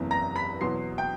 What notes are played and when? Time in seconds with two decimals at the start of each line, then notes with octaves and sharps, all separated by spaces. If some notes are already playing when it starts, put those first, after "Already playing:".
Already playing: F#1 E2 C3
0.11 A#5 A#6
0.36 B5 B6
0.61 E2 B2 F#3 C6 C7
0.98 G5 G6